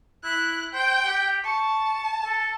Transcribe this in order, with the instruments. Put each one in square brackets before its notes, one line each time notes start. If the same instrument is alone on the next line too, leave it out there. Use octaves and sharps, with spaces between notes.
[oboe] E4 [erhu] F#6
[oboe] C5 [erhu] G5
[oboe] G4
[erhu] A5 [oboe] C#6
[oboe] A4